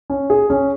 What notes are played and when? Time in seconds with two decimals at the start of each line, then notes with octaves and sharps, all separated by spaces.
0.10 C#4
0.30 G#4
0.50 C#4